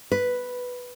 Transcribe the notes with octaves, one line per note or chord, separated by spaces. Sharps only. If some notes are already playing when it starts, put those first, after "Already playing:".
B4